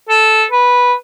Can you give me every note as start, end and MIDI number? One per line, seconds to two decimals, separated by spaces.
0.09 0.44 69
0.51 0.93 71